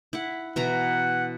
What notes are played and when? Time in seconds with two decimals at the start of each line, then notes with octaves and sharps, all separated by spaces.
0.13 E4 F#5
0.56 B2 E3 F#5 A#5